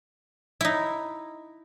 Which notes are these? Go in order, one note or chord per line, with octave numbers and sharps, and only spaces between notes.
D#4 E4